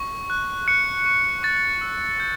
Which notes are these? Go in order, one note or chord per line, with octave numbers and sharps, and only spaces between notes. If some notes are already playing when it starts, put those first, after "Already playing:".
Already playing: C#6
F#6
F#6 C#7
C#6
C#6 A6
E6
G6